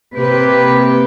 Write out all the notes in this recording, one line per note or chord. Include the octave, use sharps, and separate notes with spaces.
C3 A#3 G4 B4